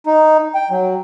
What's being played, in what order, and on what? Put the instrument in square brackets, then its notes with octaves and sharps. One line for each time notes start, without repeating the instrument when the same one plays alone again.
[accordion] D#4
G5
F#3